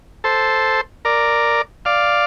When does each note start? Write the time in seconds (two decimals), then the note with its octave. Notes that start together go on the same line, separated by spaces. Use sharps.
0.24 A4 C5
1.05 A#4 D5
1.85 D5 F5